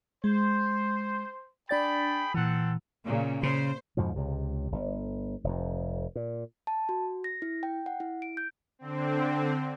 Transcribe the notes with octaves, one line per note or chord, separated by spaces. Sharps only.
G#3 C5
D4 G#4 D5 G5 B5 A6
A#2 E3 C4 A4 F#5
A#2 C#3
C#3 C5
F2 G#2 B2 F3
C#2 C3
G1
F1 F2
A#2
A5
F#4
A#6
E4
G5
F#5
E4
D7
G6
D3 C4